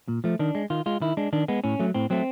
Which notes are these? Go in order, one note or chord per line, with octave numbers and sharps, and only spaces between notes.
A#2
F3 A3
D#3 D4
G#3
D#3 F4
G#3 F4
D#3 E4
G#3 D4
D#3 D4
G#3 B3
A2 C#4
F#3 A3
A2 C4
F#3 A3 C4